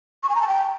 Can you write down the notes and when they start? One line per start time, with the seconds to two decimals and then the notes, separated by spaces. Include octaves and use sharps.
0.23 C#6
0.29 G#5
0.35 A#5
0.42 A5
0.48 G5